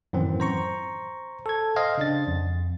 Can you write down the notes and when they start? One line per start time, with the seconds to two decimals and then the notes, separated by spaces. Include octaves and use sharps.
0.13 F#2 A2 D#3 E3 C4
0.40 C5 A#5 C#6
1.46 A4 G#6
1.76 C5 D#5 F5 G5
1.98 C#3 D4 A6
2.27 F2